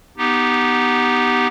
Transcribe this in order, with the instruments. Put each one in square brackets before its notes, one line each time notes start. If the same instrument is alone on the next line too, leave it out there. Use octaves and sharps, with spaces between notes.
[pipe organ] B3 D#4 G4